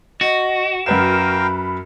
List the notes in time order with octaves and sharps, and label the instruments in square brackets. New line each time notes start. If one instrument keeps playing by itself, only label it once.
[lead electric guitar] F#4 [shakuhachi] D#5
[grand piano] F#2 B4 E7 [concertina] A#4 F5 G5 [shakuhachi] B5